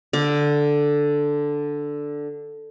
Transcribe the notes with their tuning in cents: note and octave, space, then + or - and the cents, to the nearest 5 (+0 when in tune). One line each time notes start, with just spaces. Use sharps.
D3 +0 F5 +40